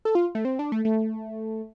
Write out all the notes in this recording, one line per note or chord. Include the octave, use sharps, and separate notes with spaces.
A4
F4
A3
C4
D4
A3
A3